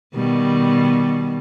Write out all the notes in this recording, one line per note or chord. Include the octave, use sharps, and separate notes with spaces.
B2 D#3 G3